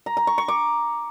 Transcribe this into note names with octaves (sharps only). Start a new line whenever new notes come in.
A#5
A#5
C#6
C#6
D6